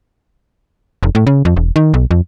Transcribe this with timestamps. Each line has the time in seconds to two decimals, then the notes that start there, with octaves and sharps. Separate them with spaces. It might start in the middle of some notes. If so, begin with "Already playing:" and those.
1.03 F1
1.15 A2
1.27 C#3
1.45 F2
1.56 E1
1.76 D#3
1.94 B1
2.11 F2